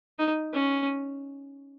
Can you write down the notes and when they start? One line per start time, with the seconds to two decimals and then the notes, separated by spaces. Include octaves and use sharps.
0.19 D#4
0.53 C#4